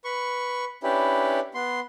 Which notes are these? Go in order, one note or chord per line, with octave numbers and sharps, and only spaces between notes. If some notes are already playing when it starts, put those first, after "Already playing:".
B4 C#6
C#4 D4 E4 G4 B4
B3 C6